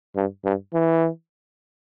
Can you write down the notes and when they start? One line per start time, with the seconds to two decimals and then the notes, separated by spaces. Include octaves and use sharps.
0.16 G2
0.45 G2
0.74 E3